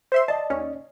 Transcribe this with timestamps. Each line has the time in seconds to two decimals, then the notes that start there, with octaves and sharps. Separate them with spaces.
0.12 C5 E5 C6
0.28 D5 D#5 A5
0.50 D#2 C#4